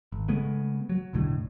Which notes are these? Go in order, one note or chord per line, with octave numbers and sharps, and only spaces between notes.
G#1
C#3 G#3 A3 B3
F#3
E1 B1 A2 D3